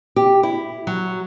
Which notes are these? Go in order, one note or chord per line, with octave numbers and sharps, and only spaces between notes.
G4
E4
F#3